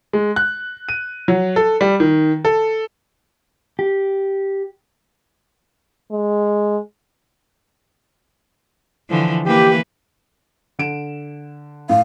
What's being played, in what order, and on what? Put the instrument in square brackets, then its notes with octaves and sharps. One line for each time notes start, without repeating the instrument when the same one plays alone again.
[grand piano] G#3
F#6
D#7
F#3
A4
G3
D#3
A4
[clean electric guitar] G4
[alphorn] G#3
[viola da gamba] D3 E3 F3
[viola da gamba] E3 A#3 B4 [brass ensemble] G4
[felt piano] D3 D7 E7
[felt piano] A2 [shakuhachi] F5